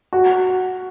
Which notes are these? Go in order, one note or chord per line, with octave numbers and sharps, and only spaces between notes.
F#4